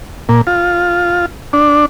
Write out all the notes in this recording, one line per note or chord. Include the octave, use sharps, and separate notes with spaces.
A#2
F4
D4